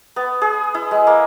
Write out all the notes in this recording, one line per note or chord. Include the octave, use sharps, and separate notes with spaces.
B3
G#4
E4
G#3
A#3